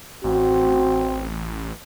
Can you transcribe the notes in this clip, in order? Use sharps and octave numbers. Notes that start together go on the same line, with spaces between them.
A1 C4 F#4